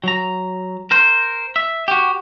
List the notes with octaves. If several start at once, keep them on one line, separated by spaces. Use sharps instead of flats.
F#3 A#5
A#4 C5
E5
F#4 G4